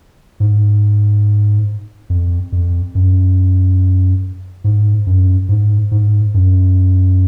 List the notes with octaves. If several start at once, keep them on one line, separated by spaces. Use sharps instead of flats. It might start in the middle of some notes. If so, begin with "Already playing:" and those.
G#2
F2
F2
F#2
G#2
F#2
G#2
G#2
F#2